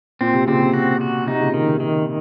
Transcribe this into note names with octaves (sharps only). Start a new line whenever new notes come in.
A#2 C4
C3
A#2 C#3 C4
C3
C3 F#4
F#4
C3 D#4
A#2 C#3
D#3
C3
D#3